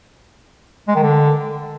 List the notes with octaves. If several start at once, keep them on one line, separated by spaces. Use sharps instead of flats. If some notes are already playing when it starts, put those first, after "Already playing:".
G#3
D#3
D3